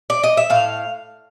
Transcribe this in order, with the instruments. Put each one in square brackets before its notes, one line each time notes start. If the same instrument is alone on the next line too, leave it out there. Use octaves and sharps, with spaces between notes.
[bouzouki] D5
D#5
E5
A2 F5